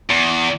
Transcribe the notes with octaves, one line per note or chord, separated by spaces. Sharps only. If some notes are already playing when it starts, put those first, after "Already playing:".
E2